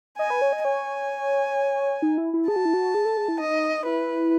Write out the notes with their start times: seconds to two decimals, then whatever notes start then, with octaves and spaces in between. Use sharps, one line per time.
0.18 D#5 G#5
0.30 B4
0.42 C#5
0.53 D#5
0.64 C#5 G#5
2.02 D#4
2.18 E4
2.34 E4
2.48 G#4 A5
2.56 F#4
2.65 E4
2.74 F#4
2.94 G#4
3.05 A4
3.17 G#4
3.28 E4
3.40 D#4 D#5
3.86 E4 B4